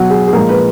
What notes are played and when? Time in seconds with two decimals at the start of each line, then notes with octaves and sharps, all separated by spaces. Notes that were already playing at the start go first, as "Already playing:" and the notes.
Already playing: B2 F#3 F#4
0.10 G#4
0.28 G#4
0.33 A#2 F3 G#3 A#4
0.49 B4